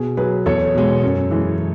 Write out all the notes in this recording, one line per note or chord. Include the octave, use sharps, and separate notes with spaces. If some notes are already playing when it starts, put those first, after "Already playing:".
Already playing: B2 G#4
F#3 G#4 B4
E2 A4 C#5
B2 G#3
F#2
E3 G#3